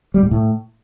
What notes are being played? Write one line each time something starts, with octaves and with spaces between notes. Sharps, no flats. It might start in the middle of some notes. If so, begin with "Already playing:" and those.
G3
G#2
A2